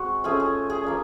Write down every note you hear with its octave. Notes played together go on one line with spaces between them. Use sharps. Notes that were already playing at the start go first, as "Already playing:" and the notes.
Already playing: G#3 C4 F#4
F3 A3 C#4 F4 G#4
G#4
G#4
F3 A#3 D4